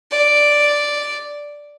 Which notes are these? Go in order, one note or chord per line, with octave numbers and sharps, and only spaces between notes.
D5